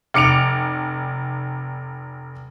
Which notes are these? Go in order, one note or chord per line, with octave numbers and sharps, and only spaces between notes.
F1 D6 C#7 D7 F7